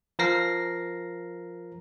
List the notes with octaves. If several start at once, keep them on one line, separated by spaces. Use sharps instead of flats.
F3 A#4 A#6 C7